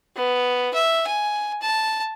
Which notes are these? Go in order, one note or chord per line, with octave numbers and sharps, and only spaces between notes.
B3
E5
G#5
A5